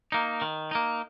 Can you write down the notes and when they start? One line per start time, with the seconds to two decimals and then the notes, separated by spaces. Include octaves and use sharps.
0.12 A#3 D#4
0.42 D#3
0.71 A#3 D#4